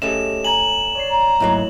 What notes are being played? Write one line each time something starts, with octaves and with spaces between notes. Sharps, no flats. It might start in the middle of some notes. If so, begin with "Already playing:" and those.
A3 C#4 G4 G#4 D#5 E7
G#5 A#5 G#6 F#7
C#5 D5 C7
A#5
G#2 F#3 A3 A#3 E4 C#5